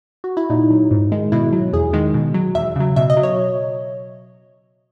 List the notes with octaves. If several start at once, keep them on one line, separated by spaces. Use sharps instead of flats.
F#4
E4
A#2 D#4
F#3
G#2
D#3 G#3
B2 E4
F#3
E2 G#4
D#3 G#3
B2
F#3
E2 E5
C#3 F#3
B2 E5
D#5
F#3
C#5